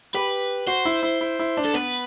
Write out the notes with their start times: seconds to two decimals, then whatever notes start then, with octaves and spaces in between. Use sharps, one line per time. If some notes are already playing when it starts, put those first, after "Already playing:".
0.14 G4 B4
0.67 F#4 C5
0.85 E4
1.03 E4
1.21 E4
1.39 E4
1.57 D4
1.65 A4
1.74 B3 B4